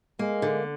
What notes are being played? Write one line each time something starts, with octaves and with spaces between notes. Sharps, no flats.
G#3 A#3
D3